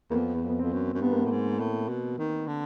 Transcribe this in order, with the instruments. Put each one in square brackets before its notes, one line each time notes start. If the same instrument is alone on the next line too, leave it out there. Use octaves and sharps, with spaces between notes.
[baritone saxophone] E2 [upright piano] A#3
[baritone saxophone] F2 [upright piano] B3
[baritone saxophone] E2
F2
[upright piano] B3
[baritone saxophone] F2 [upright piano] C4
[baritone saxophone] F#2
F#2
[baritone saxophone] G2 [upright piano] B3
[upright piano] A#3
B3
[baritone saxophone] A2
G#2
A2
B2
D#3
D3